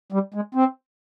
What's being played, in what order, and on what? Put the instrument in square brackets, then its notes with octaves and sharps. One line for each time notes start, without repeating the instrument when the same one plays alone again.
[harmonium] G3
G#3
C4